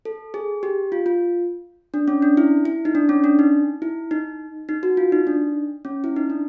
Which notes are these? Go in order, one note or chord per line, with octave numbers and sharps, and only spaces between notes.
A4
G#4
G4
F4
F4
D4
C#4
D4
E4
E4
D#4
D4
C#4
D4
D#4
E4
D#4
D#4
F#4
F4
D#4
D4
C#4
E4
D#4
D4